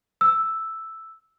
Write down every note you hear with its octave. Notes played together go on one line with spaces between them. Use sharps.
E6